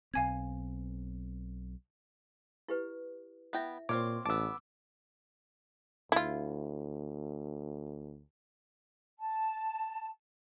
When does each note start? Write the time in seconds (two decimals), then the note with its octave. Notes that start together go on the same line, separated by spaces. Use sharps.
0.14 B1 C4 F5 G#5 G#6
2.68 E4 G4 B4
3.53 B3 E4 E5 G5
3.89 A#2 C4 F4 C#5 D6
4.25 A1 B3 A5 D6 E6
6.12 D2 E4 F4
9.19 A5